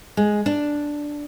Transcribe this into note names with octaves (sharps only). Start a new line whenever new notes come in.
G#3
D4